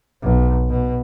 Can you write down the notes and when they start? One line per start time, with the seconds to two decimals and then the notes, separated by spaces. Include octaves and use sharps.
0.23 B1
0.69 B2